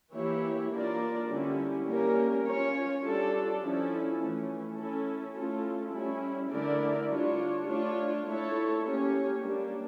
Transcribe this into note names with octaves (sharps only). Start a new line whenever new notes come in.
E3 A#3 E4 G4 C#5
A#3 D4 F4 A#4 D5
D3 G3 C#4 E4 G4
G3 A#3 C#4 G4 A#4
C#4 F4 C#5
G3 D4 F4 A4 D5
F3 C#4 E4 A4
E3 A3 C#4
C#4 E4 A4
A3 C#4 F4 A4
G3 C#4 E4
D3 A3 E4 A#4 D5
G3 D4 F4 C#5
A3 D4 F4 C#5
A3 E4 A4 C#5
A#3 C#4 G4 C#5
G3 A#3 D4